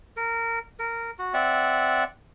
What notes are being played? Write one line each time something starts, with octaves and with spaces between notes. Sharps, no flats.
A#4
A#4
F#4
C4 D5 E5 F#5